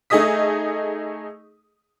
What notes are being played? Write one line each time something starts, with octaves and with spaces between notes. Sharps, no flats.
A3 D#4 G#4 D#5 D#6 B6